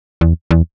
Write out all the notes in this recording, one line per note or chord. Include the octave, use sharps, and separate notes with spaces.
E2
E2